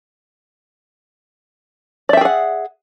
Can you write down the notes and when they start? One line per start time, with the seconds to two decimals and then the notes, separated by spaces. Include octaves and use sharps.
2.09 D5
2.13 E5
2.17 G5
2.21 G#4
2.25 F#5